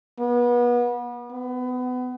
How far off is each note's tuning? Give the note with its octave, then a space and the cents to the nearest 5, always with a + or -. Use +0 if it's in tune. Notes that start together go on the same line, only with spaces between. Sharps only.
B3 -30
B3 +25